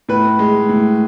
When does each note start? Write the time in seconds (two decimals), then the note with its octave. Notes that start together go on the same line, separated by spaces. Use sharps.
0.09 A2 B4
0.39 G#3
0.69 A2